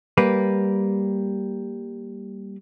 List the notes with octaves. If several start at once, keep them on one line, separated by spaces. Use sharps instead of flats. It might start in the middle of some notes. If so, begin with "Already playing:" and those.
G3 A#3 B4